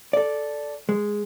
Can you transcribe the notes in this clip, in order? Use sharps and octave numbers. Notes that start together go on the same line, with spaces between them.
A4 D5
G#3